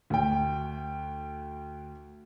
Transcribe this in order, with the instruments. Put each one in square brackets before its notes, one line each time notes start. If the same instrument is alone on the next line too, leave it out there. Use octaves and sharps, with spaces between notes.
[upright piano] D2 G5